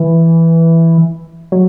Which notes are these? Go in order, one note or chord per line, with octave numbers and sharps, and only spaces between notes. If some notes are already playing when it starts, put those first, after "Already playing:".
Already playing: E3
F#3